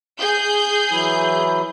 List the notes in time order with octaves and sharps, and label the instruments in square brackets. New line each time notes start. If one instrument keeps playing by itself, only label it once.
[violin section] G#4 G6
[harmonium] E3 F#3 E4